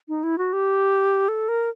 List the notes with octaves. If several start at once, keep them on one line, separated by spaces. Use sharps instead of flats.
D#4
E4
F#4
G4
A4
A#4